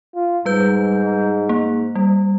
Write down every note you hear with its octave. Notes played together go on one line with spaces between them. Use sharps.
F4
G#2 G3 B4 G6
A#3
G3